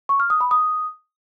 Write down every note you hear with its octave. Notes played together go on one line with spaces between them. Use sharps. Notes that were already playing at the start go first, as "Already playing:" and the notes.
C#6
F6
D#6
B5
D#6